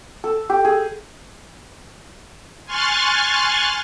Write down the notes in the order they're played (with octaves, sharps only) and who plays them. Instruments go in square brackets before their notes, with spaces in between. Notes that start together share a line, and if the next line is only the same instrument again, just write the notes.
[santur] A4
G4
G#4
[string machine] G#5 C6 C#6 F6 F#6 A6